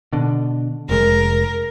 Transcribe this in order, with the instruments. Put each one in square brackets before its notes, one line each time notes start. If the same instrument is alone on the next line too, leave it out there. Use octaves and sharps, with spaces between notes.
[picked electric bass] B2 D3
[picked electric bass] F1 G#3 [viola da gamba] A#4